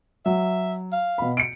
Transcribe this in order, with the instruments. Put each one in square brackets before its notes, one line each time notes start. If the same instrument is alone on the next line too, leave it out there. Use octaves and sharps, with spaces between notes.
[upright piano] F#3 [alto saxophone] E5
[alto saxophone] F5
[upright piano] B2 B5
C#7 D7